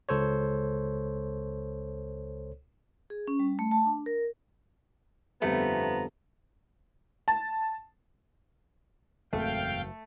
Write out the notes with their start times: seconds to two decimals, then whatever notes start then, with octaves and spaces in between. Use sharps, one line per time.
0.09 C#2 A4 C5 C#5
3.10 G#4
3.28 C#4
3.39 G3
3.59 A3
3.71 A5
3.85 D4
4.06 A#4
5.42 G1 F2 F3 G3 A3 B3 A#5
7.28 A5
9.33 F#1 E2 G#2 A3 C4 F5 G5